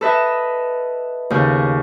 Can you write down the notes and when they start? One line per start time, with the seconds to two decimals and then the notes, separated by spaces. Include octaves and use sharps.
0.01 A4 B4 D#5 E5
1.30 D#2 C#3